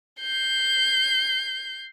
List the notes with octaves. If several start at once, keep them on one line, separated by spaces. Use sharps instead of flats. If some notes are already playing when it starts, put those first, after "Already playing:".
G6 C7